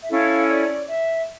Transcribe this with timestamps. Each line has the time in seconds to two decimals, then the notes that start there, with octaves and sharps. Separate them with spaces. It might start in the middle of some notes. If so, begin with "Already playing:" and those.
0.03 E5
0.10 C#4 E4 A4 C#5 F5
0.49 D5
0.88 E5